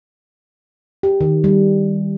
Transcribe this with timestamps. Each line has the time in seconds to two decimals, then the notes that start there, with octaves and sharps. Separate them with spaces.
1.03 G4
1.21 D#3
1.44 G3